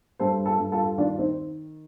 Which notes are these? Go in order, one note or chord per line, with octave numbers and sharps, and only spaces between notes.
G2 A4 C5
F4 A4
G2
F4 A4
D#3 D4 F4
C4 D#4